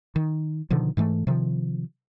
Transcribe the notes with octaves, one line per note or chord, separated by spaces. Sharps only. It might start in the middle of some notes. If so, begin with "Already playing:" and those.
D#3
B2 D3 D#3 F3
G#2 E3 G3 A3
C3 D#3 F3